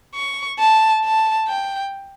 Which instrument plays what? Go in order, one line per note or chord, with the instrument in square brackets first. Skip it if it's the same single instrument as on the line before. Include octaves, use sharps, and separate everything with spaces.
[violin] C#6
A5
A5
G5